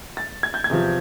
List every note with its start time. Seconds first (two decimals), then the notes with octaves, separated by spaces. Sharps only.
0.17 A6
0.43 G#6
0.54 G6
0.64 G#6
0.70 E2 C3 F3